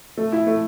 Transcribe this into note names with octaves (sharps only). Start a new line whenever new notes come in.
A3
E4
A3